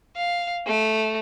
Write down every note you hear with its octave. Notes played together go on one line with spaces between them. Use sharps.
F5
A3